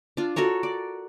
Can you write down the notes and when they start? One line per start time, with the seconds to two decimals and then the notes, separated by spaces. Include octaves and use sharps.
0.17 D4 F4
0.36 F#4 A4 A#4 C#5
0.63 D5